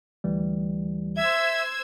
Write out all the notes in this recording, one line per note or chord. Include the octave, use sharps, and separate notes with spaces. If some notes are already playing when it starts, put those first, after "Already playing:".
D2 E3 G3
C5 E5 E6 G#6